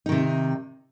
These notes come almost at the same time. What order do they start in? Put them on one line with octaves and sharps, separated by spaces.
D#4 D#3 C3